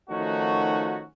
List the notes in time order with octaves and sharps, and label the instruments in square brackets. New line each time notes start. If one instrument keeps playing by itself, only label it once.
[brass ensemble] D#3 F3 A3 C#4 D#4 F#4